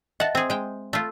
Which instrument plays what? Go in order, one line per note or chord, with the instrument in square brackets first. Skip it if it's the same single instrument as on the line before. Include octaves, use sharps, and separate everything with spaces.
[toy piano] D#5 E5 [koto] F#5 A5
[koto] C4 G#4
G#3 G5
A3 F4